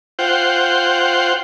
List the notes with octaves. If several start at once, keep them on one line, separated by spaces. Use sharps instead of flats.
F4 C5 F#5 G5